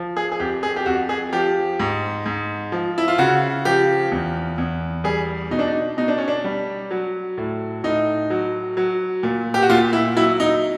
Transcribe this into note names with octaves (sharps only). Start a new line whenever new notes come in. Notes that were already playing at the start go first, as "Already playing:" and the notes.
Already playing: F3
G#4
G#4
F2 G4
G#4
G4
F2 F#4
G#4
F3 G4
G#2
G#2
F3
E4
F4
C#3 F#4
F3 G4
E2
E2
G3 G#4
B2 D#4
D4
D#4
B2 D#4
D4
C#4
D4
G3
F#3
A2
A2 D#4
F#3
F#3
A#2
G4
F#4
A#2 F4
E4
F#3 E4
D#4